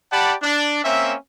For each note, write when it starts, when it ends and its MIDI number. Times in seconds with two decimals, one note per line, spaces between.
0.12 0.34 67
0.12 0.34 74
0.12 0.34 78
0.12 0.34 81
0.12 0.34 83
0.42 0.81 62
0.85 1.14 58
0.85 1.14 60
0.85 1.14 61
0.85 1.14 76